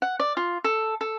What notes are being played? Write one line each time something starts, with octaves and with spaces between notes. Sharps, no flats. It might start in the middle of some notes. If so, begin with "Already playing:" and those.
F#5
D5
F4
A4
A4